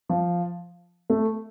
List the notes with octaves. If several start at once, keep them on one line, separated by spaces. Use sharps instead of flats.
F3
A3